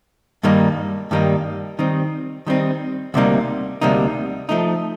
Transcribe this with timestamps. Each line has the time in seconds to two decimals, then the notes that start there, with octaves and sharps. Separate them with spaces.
0.43 G2 D#3 G3 A#3 D#4
1.11 G2 D#3 G3 A#3 D#4
1.79 D#3 G3 C4 D#4
2.47 D#3 G3 C4 D#4
3.14 D2 C3 G3 A#3 D#4
3.81 D2 C3 G3 A#3 D#4
4.49 F3 A3 D#4